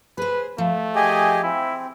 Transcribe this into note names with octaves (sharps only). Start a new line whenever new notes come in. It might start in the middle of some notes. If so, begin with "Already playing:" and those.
G#4 B4 C5
F3 A3
G4 G#4 D#5 G#5
C4 E4